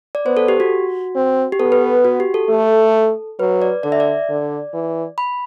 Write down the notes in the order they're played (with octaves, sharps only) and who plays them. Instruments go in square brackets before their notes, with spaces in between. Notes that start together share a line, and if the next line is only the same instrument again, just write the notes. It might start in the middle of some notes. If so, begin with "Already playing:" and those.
[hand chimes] D5
[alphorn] B3 [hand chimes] C5
[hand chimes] A4
G4
F#4
[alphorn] C4
[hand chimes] G4
[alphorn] B3 [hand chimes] A4
[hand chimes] B4
F#4
G4
A4
[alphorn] A3
[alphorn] F#3 [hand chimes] B4
[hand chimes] D5
[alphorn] D3 [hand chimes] D5
[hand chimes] E5
D5
[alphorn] D3
E3
[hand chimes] B5